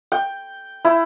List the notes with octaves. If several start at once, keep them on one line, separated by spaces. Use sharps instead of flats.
G5
E4